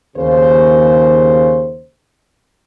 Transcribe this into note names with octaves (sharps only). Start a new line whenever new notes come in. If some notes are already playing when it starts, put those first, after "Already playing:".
D#2 C#3 C5